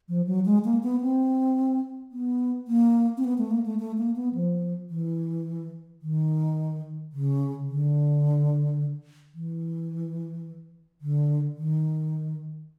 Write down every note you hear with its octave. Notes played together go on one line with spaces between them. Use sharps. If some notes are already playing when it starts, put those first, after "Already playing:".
F3
F#3
G#3
A#3
B3
C4
B3
A#3
C4
B3
A3
A#3
A3
A3
A#3
B3
F3
E3
D#3
C#3
D3
E3
D3
D#3